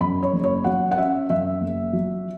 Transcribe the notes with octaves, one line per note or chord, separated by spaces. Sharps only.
F#2 B5
C#5
F#1
C#5
F#3 F#5
F#5
C#4 E5
F#2 E5
F#1
F#3